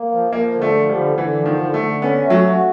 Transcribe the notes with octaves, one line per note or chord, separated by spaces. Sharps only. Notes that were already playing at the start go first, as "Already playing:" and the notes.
Already playing: A#3
F3
F3 A#3
D3
A3
F3
G3
D3
D3 E3
F3
D#3
D3
A3
D3
B3 C#4
A3
F#3
F#4